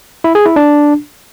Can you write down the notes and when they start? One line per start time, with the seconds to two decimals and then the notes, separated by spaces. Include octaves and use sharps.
0.24 E4
0.35 G#4
0.46 E4
0.56 D4